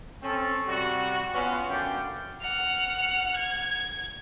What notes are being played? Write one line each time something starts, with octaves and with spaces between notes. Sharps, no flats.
C4 C#4 A4
C3 G3 F#4
B3 C#4 F4
F#2 D3 D5 F5 G5
F#5 F6
G#6